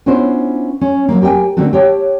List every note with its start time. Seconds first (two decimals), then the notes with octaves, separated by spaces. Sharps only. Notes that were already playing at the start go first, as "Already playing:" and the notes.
0.06 B3 C#4 D4 E4 F4 C5
0.81 C#4
1.09 F#3 G#3 A#3
1.22 G4 A#4 D#5 G5 G#5
1.57 D3 A3 A#3 C4 F#4 A4
1.73 G4 C#5 G5 A5